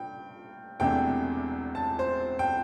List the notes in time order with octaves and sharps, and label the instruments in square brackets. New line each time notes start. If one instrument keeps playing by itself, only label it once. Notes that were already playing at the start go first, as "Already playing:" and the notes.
Already playing: [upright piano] G2 G5
E1 E2 C3 A3 D4 G5
A5
C5
G5